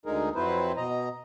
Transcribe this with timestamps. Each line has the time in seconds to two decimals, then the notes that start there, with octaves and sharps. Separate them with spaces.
0.06 D2 D3 G#3 D#4 G#4 A#4
0.35 F2 F#3 C4 E4 B4 C5
0.77 B2 D#5 A#5